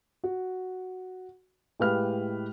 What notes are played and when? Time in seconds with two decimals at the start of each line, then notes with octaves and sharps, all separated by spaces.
0.24 F#4
1.79 A2 G#3 G4 B4 F5 F6